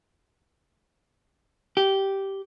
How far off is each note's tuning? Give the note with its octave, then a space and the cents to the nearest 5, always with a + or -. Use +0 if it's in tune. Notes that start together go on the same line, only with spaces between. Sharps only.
G4 -10